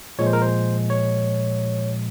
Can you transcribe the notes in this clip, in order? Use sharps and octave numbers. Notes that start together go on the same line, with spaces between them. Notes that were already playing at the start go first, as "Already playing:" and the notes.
A#2 F3 G#3 C#5
C5
A#4
C5
C#5